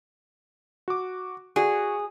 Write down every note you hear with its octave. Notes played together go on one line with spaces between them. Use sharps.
F#4 D6
F#4 G#4 D5